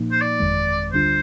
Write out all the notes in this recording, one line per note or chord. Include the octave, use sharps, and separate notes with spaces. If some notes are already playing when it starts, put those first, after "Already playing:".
Already playing: A#2 F3 A#3 D#4
C5
D5
G1 F2 D#3 G#3
D2 D3 G3 D4 F4 C5